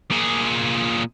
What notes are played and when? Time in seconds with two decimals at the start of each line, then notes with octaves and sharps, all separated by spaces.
0.11 A#2 G#4